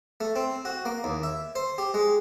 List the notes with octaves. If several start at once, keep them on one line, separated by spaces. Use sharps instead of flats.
A3
C4
F#4
A#3
D#2
E5
C5
G4
G#3